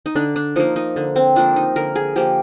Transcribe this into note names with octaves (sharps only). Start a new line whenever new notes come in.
D#4
D3 D4
D4
F3 A#3 D#4
D#4
D3
C4
F3 A#3 D4
D#4
D3 A#4
G#4
F3 A#3 G4